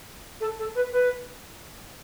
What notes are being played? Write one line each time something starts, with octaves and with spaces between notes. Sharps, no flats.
A4
A4
B4
B4